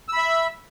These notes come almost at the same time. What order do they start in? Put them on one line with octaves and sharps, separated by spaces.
E6 B5 E5